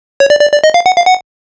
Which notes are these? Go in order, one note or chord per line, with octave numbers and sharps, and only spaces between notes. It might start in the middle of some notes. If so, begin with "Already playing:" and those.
C#5
D5
D5
D5
D#5
F5
F#5
F5
F#5